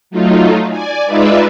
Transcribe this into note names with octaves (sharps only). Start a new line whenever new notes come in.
F#3 A3 D#4 F4
D5 G#5
G#3 D#4 F4 B4 D5 E5